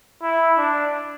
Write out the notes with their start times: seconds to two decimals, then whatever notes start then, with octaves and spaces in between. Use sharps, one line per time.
0.22 E4
0.58 D4